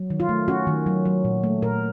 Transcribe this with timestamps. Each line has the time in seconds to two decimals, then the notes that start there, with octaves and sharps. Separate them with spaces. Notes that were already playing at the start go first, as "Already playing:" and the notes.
Already playing: F#3
0.10 D#3
0.20 F4
0.29 A3
0.48 C#4 F#4
0.67 D#3
0.86 F#3
1.05 F#3
1.24 A#2
1.43 A3
1.62 A#2 A#4